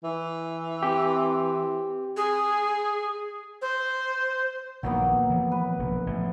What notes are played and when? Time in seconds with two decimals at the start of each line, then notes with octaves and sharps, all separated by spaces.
0.04 E3
0.82 C4 G4
2.17 G#4
3.62 C5
4.83 A#1 A#2 D#3 F#3 A#3 B3
5.29 E3 F3 A3
5.52 B4
5.79 E1 A#1
6.06 A1 A2 F3